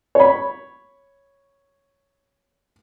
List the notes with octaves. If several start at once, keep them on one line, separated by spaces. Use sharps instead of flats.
C#5 B5